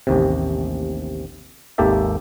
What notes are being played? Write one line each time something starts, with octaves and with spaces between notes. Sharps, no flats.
A1 D#2 C3
G#1 D#2 A#3 G4 A4 E5